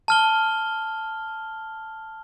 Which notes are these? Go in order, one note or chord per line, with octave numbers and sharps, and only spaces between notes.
A5 F6 G7